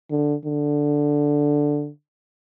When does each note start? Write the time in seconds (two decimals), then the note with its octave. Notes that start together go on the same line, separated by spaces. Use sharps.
0.11 D3
0.45 D3